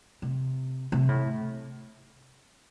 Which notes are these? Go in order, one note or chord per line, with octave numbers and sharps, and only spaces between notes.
C3
C3
A2